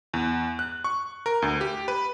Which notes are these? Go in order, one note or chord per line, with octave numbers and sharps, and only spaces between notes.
E2
F#6
C#6
A#4
D2
G4
B4